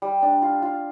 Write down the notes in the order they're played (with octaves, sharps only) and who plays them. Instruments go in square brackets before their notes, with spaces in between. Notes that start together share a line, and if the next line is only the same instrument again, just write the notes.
[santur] G3
D4
F4
F4